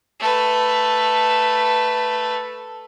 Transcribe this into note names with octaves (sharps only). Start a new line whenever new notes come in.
A3 B4